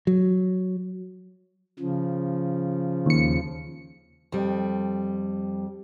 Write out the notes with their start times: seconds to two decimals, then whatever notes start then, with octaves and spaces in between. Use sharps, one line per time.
0.07 F#3
1.79 C#3 F3
3.06 D#2 C#7
4.32 F2 G3